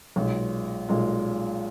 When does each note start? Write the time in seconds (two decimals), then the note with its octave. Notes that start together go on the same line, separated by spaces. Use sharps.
0.16 B1 A#2 G#3
0.89 B1 A#2 G#3